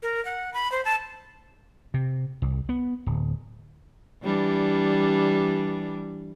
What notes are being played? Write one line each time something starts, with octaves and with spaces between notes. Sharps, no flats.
A#4
F#5
B5
C5
A5
C3
C2
B3
D1
E3 G3 D4